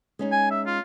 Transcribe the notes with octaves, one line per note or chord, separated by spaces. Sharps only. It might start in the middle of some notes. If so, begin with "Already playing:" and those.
G#3 C#4 D#4
G#5
E5
F4